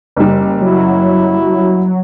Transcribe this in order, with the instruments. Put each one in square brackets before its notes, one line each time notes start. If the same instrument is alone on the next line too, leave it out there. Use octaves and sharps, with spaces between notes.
[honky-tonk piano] F#1 G3
[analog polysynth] F#3 [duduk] E4